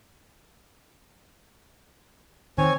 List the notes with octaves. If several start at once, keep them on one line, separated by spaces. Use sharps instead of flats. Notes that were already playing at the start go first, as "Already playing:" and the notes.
D#3 C4 C#5 G#5